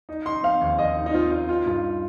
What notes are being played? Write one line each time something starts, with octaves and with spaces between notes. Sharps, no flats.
D#4
D#4 C6
C4 F5
D#2
D#2 D#5
D#4
D#4
C4 F4
D#4 F4
D#4 F4
G2 F4